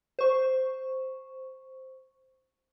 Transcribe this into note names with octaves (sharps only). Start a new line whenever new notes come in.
C5 C#6